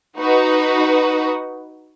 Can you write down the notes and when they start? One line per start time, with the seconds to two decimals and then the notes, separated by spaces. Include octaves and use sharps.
0.18 D#4 F#4 B4